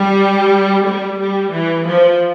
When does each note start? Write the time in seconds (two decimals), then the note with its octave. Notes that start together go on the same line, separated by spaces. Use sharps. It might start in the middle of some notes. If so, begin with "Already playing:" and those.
Already playing: G3
0.87 G3
1.20 G3
1.54 E3
1.87 F3